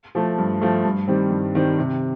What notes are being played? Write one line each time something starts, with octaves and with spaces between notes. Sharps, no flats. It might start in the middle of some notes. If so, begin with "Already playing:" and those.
F3 A3
G2
F3 A3
G2
D#3 G3 C4
G2
D#3 G3 C4
C3